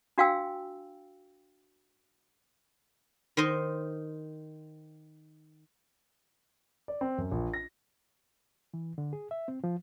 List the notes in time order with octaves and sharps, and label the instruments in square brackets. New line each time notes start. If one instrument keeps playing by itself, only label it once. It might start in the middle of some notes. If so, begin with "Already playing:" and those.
[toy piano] D4 F#4 F5 G5 G#5 E6
[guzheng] D#3 C5 D#5
[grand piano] D5
C4
F#2
A#1
A#6
[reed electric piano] E3
D3
G#4
E5
C4
F3